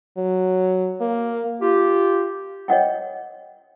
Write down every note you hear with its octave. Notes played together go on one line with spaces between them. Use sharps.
F#3
A#3
F4 G4
C#5 D#5 F#5 G5